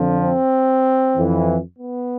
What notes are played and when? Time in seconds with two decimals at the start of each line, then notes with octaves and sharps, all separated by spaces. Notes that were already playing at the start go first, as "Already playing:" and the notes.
Already playing: F2 D3 F3
0.20 C4
1.15 F2 E3
1.78 B3